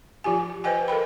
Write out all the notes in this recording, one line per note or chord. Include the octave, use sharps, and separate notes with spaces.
F3 F4 G4 G#5
B4 C5 D#5 G5 G#5
A4 A#4 G5 B5